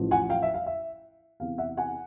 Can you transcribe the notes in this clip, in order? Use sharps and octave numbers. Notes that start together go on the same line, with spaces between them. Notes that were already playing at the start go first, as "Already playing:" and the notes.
Already playing: A1 A2 F3
F#5 G#5
F5 G5
E5
F5
E5
E2 C3 E3 F5
E5 F#5
F#5 G#5